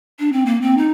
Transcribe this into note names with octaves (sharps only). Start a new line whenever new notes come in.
D4
C4
A#3
C4
D#4